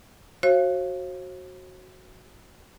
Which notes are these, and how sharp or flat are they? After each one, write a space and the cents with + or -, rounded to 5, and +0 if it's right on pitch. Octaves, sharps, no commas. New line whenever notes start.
F#4 +0 C5 +45 F5 -25